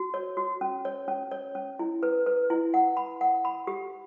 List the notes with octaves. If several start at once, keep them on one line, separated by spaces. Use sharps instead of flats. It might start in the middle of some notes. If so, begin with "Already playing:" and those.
Already playing: F#4
C#5
F#4
C#4
C#5
C#4
C#5
C#4
E4
B4
B4
E4
F#5
B5
F#5
B5
G4